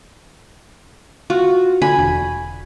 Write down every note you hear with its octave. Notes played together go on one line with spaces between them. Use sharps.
F4 F#4
D3 G#5 B5
E1